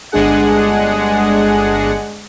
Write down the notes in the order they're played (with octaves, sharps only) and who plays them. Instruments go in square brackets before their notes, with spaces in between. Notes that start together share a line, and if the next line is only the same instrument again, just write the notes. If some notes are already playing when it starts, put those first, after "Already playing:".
[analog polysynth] G1 G#3 D4 G#4 F#5